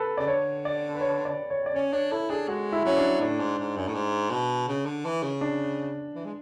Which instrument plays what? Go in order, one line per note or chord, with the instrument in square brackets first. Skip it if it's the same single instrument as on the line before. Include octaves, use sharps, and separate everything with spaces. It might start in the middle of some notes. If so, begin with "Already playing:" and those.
Already playing: [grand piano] A4 B4
[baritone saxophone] C#3 [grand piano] D5
[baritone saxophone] D3 [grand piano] C#5
[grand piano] D5
B4
C#5
D5
C#5
D5
[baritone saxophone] C#4 [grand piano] C#5
[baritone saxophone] D4 [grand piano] C#5
[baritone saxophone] E4 [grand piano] A4
[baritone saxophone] D4 [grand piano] G#4
[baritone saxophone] G#3 [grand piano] F#4
[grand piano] E4
[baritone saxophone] F#3 [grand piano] C#4
[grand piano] D4
[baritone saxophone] A2 [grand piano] D4
[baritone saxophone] G#2
G#2
F#2
A2
G#2
B2
C#3
D3
E3
C#3
[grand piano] D4
[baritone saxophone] E3
G#3